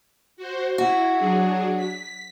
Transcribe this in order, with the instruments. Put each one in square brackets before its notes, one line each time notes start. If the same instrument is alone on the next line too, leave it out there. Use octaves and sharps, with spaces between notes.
[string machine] F#4 C5
[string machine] E4 [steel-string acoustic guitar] F#4
[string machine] F#3 D4 G#4
B6